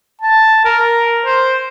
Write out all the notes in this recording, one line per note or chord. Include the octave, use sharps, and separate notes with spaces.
A5
A#4
C5